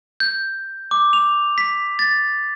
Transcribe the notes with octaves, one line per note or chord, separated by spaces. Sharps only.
G6
D6
F7
B6
A6